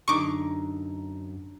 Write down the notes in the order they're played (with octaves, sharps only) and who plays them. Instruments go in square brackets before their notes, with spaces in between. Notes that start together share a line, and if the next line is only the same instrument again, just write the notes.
[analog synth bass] F#2 [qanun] D3 D#4 [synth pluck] C#6 D6